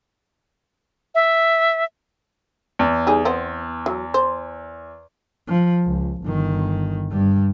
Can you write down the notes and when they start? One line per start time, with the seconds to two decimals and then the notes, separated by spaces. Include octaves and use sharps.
1.15 E5
2.79 E2
3.07 G3 D#4 G#4
3.25 B3 C4
3.86 F#3
4.14 C5
5.47 F3
5.83 C#2
6.22 G1 D#3
7.11 G2 G3